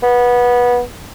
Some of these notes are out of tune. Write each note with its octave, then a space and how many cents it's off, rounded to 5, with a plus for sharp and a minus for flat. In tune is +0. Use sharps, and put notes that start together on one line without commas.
B3 -20